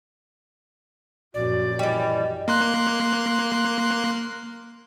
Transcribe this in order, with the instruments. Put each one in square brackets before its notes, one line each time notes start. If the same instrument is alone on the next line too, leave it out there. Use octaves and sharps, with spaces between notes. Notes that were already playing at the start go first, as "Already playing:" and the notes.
[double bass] A#1 F#2 [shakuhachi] F#4 [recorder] D5
[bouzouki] E3 G3 [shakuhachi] D#5
[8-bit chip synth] A#3 C6 F#6